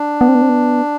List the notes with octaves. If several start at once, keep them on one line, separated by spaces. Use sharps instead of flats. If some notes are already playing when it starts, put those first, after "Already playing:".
Already playing: D4
B3
C4
B3
C4
B3